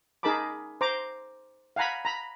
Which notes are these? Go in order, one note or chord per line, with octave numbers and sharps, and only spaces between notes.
D#4 G#4 A#4 A5 B5 D6
C5 A#5 D6
F5 F#5 G#5 A#5 B5
A#5 B5